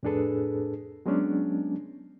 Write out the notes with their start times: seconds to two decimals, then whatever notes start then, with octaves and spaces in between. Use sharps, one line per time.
0.03 F2 A2 D4 G#4 A4 B4
1.06 F#3 G#3 B3 C#4 D4